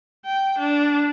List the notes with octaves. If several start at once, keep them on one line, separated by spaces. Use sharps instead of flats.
G5
D4